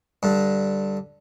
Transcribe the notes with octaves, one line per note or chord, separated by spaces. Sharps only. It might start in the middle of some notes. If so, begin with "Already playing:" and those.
G2 D3